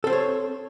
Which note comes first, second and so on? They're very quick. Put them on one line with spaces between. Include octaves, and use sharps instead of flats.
A4 C4 C5 C#5